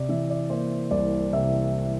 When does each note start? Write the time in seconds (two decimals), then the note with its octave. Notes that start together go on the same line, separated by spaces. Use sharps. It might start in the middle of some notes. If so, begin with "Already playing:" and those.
Already playing: C3 D5
0.09 E3 E5
0.30 D5
0.50 A#3 C5
0.91 C2 D5
1.33 C3 E5